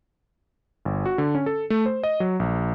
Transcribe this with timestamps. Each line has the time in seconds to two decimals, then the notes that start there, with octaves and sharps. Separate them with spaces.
0.85 G1
1.06 F#4
1.18 D3
1.35 C#4
1.46 A4
1.70 A3
1.86 C5
2.04 D#5
2.20 F#3
2.40 A#1